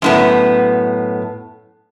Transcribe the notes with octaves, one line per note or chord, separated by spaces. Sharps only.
F#2 A2 B3